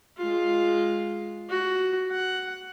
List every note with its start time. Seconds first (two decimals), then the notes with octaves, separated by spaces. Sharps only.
0.17 G#3 F4
1.50 F#4
2.11 F#5